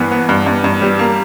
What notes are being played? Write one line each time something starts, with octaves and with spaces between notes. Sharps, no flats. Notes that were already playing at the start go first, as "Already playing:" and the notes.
Already playing: G2 E3 B3
B3
G2
G2
G2
G3
A#3